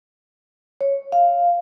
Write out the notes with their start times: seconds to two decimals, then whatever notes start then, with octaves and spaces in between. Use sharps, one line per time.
0.81 C#5
1.12 F5